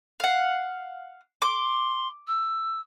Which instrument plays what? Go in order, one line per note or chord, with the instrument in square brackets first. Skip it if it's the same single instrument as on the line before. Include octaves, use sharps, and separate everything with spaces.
[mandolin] F5 F#5
[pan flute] C6 [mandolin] D6
[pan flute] E6